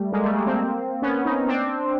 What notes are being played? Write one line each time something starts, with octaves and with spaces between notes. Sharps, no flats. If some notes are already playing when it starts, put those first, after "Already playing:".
Already playing: G3 A3
G#3 A#3
G3 A3
G#3 A#3
A#3 C4
B3 C#4
C#4 D#4
C4 D4